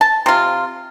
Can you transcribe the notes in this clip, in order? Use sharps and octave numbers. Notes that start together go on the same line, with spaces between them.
A5
C3 F4